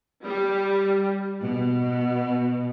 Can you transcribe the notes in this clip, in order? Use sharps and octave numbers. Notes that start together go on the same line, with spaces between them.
G3
B2